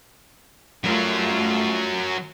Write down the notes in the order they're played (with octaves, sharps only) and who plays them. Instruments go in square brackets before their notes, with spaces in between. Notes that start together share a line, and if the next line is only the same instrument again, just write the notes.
[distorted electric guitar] F#3 A#4 [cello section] G3 A3 F4